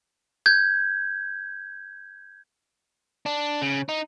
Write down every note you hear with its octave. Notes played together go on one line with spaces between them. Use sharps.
G6 G#6
D4
C#3
D#4